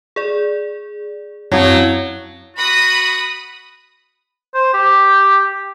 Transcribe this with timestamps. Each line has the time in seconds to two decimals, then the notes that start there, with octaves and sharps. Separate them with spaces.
0.16 G#4 D5
1.52 F#2 F#3 C4 E4
2.56 F#4 B5 D#6 F#6
4.55 C5
4.74 G4